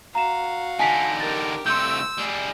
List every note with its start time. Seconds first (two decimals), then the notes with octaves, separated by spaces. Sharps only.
0.15 F#4 F5 A#5 E7
0.79 D3 D#4 G#5 A5 B6
1.20 G4 A#4 A6
1.66 C2 A3 C6 E6 G6
2.18 G3 G#4